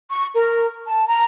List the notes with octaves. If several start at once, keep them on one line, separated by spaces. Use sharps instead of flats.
C#6
A#4
A5
A#5